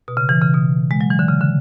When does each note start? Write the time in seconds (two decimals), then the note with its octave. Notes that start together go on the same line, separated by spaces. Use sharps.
0.08 B2
0.17 C#3
0.29 E3
0.41 C#3
0.54 B2
0.91 G#3
1.01 F#3
1.10 E3
1.19 D3
1.28 C#3
1.41 D3